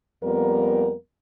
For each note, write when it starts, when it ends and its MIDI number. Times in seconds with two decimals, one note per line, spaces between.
0.23 0.93 41
0.23 0.93 55
0.23 0.93 58
0.23 0.93 59
0.23 0.93 70